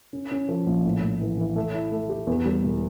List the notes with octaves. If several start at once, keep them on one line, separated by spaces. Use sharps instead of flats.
C#4
C#4
F3
A#1
A2
A2
E3
E3
A3
E4
A3
G4
E2
G3
E1